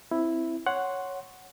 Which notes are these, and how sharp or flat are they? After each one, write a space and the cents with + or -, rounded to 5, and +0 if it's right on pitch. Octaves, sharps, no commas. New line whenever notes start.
C4 +0 E4 +0
C#5 +0 F#5 +0 C6 +0